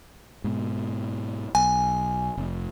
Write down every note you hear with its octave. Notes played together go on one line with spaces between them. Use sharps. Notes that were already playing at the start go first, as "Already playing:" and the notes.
G#2 B2
B1 G#5
F1